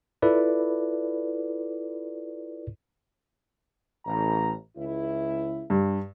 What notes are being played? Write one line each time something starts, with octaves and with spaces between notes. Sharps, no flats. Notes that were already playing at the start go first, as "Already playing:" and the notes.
E4 F4 A4 B4 D5
A1 A#5
C#2 E4
G2